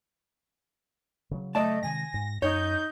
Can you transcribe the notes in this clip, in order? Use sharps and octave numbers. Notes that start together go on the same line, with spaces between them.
C#3 F#3
A3 D5 D#5 A5
C3 D#3 G#3 G#5 A#6
G#2
F#2 C#4 D#4 C#5 G6